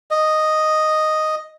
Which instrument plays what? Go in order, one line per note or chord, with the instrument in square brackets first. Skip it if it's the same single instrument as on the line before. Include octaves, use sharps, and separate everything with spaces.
[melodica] D#5